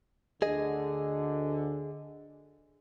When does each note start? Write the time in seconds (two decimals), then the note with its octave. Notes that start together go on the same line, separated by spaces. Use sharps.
0.42 D2 D3 G#4 D#5